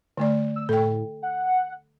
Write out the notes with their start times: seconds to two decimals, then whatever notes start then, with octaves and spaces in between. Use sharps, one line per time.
0.17 D3 A3 D5
0.56 E6
0.69 A2 A4 G5
1.22 F#5